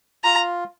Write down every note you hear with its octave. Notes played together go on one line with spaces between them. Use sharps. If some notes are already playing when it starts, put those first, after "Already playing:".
F4 A#5